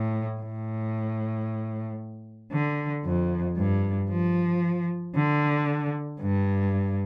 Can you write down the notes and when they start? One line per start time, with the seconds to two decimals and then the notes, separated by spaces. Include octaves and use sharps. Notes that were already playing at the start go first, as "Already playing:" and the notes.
Already playing: A2
0.41 A2
2.52 D3
3.05 F2
3.57 G2
4.10 F3
5.15 D3
6.21 G2